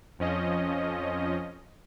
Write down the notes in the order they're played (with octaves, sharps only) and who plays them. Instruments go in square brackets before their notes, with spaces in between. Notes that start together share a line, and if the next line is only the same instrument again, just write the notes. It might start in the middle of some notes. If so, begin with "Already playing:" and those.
[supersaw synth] F2 F3 C#4 D#5